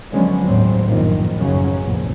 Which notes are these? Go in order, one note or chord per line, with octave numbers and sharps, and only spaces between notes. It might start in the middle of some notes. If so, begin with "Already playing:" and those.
D3 F3 F#3 G#3 B3 C#4
G1 D#2 A2 F#3 C4
A#1 F#2 A#2 D#3
A1 F#2 C#3 F#3 C#4
F1 A#1 E2